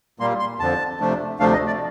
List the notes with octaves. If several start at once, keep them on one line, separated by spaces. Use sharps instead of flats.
A#2 G3 A#3 C6
C6
F2 D3 F3 A5
C3 F3 A3 D4
D2 C3 F3 A3 D4 F5
D#5
D5